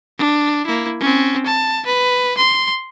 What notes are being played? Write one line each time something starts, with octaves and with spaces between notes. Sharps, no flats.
D4
A#3 E4
C4 C#4
A5
B4
C6